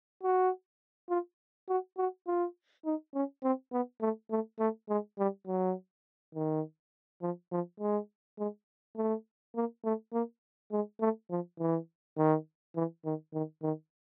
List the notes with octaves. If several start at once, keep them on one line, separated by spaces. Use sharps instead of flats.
F#4
F4
F#4
F#4
F4
D#4
C#4
C4
B3
A3
A3
A3
G#3
G3
F#3
D#3
F3
F3
G#3
G#3
A3
A#3
A3
A#3
G#3
A3
F3
E3
D#3
E3
D#3
D#3
D#3